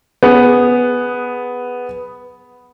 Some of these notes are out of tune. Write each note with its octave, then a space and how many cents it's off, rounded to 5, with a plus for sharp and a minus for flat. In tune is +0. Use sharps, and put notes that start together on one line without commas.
B3 +0 G#4 +0